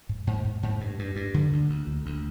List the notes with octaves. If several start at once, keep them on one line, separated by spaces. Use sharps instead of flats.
G#2
G#2
G#2
G#2
G2
G2
G2
D3
D2
D2
D2
D2